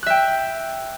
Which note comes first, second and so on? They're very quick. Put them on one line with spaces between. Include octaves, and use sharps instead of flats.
F#6 E5 G5